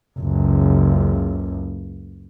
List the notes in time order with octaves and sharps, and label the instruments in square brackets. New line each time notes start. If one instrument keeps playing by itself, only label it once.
[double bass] F#1 C#2